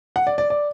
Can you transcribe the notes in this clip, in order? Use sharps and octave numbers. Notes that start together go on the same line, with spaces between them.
F#5
D5
D5
D5